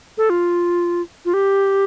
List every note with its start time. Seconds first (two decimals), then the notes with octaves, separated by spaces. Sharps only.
0.18 A4
0.30 F4
1.25 F4
1.34 G4